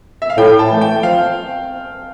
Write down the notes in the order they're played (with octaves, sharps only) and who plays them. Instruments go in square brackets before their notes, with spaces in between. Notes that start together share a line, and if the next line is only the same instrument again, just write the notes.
[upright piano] E5
F5
[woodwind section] A2 [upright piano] G5
[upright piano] A5
[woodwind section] E3 A3
[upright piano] G5
[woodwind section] F3 [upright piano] F5